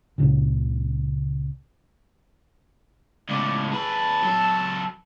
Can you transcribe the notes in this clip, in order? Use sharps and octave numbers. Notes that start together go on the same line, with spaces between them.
C#2 A#2 C#3
C#2 A2 D5
G#4 B4 A5
F#3 A4